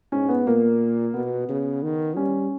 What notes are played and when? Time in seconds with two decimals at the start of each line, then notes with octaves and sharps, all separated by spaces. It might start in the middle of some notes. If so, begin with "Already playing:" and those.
0.12 G#2 C#4
0.29 B3
0.47 A#2 A#3
1.14 B2 B3
1.49 C#3
1.83 D#3
2.16 G3 C#4